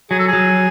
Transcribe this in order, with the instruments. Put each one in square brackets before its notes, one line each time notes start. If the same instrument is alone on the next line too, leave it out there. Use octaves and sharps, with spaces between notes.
[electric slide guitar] F#3 [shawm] G#4
[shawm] A4
G#4
[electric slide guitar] F#3